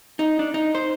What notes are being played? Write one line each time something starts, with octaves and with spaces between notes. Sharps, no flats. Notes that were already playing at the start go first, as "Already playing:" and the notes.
D#4
D4
D#4
C5